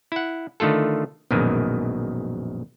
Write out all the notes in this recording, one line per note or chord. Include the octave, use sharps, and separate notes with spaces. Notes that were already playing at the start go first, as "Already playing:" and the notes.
E4 F#5
D3 D#3 A3 F4 A4
A#1 F#2 B2 D#3 G#3